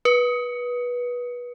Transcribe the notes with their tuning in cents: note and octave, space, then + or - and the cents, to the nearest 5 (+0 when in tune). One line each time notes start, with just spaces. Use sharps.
B4 -20